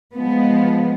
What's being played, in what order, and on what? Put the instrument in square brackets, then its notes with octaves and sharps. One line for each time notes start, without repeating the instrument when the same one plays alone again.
[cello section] F3 G#3 B3